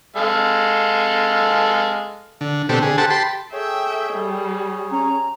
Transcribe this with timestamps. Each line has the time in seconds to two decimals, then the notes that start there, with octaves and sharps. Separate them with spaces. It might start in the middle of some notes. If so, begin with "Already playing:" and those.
0.16 G#3 A4 F5
2.41 D3
2.69 B2 D3 C4 G4 A4
2.83 D3 G#4
2.98 G4 A4 C5 F#5 A5
3.10 G4 A5 B5 C6
3.53 G#4 A4 C#5 E5 G5
4.14 G3
4.92 C#4 A#5